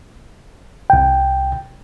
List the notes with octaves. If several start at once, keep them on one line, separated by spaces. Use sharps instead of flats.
C2 G5